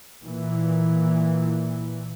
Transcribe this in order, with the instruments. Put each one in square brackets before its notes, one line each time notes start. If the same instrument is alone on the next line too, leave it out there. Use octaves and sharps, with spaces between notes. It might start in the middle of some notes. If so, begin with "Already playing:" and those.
[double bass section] A#2 E3